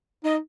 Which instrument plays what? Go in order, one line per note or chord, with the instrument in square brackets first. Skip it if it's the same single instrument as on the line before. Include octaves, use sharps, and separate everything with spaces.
[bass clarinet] D#4 [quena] D#5